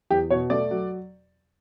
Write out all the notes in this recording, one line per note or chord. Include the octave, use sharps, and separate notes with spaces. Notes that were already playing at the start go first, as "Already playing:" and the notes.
E2 G4
B2 C#5
A3 D5
F#3